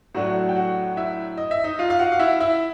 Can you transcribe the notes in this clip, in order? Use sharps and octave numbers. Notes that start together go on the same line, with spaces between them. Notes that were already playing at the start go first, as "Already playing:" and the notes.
A2 F#3 A3 D4 F#4 F#5
G5
F#4 F#5
E4 E5
D#5
E5
D#4 D#5
F4 F5
F5
F#4 F#5
F5
E4 E5
E4 E5